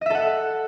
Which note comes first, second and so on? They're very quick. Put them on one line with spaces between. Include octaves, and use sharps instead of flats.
D#5 E5 A4 F#5